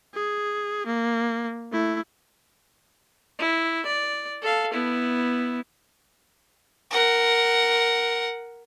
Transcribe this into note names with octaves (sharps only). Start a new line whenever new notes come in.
G#4
A#3
A3 E4
E4
D5
A4 F5
B3 E4
A#4 F#5